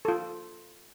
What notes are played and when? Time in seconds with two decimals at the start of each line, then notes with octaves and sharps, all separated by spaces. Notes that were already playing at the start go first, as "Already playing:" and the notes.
0.05 F4 A4